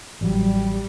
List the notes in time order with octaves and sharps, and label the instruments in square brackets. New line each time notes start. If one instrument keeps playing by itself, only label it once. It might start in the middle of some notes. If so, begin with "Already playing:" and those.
[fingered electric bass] A1 F#3 [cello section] G3